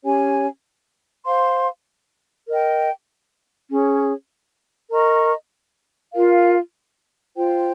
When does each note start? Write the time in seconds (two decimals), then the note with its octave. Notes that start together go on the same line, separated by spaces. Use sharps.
0.03 C#4 G4 C#5 G#5
1.25 C5 F5 C6
2.47 A#4 D#5 G5
3.69 C#4 G#4 C#5
4.91 A#4 D#5 A#5 C#6
6.13 F4 A#4 F5
7.35 F4 C5 G5